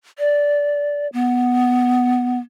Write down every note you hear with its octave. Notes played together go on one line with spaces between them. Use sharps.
D5
B3